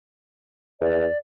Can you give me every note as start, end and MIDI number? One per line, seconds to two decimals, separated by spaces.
0.81 1.06 40
0.81 1.18 74